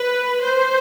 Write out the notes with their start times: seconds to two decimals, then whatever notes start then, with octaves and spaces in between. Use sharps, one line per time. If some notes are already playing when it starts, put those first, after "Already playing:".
Already playing: B4
0.43 C5